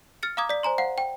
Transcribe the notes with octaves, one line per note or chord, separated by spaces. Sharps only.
F6 A6 C#7
F5 A#5 D6 D#6 G#6
D5 B6
C5 G#5 A#5 C6
C5 F5 F#5
G5